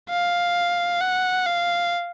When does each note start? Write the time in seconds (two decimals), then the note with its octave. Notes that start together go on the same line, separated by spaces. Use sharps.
0.09 F5
1.01 F#5
1.47 F5